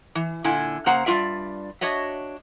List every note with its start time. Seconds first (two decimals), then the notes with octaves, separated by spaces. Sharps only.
0.15 E3
0.44 A#2 D3 E4 G#5
0.86 C#3 A#3 C5 F#5 A#5
1.06 G2 A3 F4 D5 E5
1.81 D4 F#4 C#5 D#5 E5